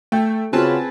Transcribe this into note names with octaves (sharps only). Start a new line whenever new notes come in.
A3 G5
C#3 C4 F4 F#4 G#4 B4 A5